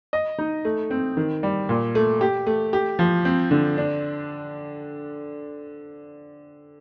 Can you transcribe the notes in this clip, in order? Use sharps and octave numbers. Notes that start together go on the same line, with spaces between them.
D#5
D#4
A3
C4
D#3
G3
A#2
A3
G4
A3
G4
F3
C4
D3
D4